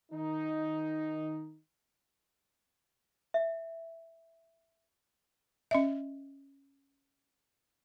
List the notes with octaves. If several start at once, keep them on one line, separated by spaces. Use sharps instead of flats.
D#3 D#4
E5
C#4 D#5 E5